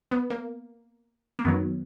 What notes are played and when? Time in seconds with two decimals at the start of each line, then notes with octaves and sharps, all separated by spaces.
0.11 B3
0.30 A#3
1.39 A#3
1.45 F#2 D#3 F#3 B3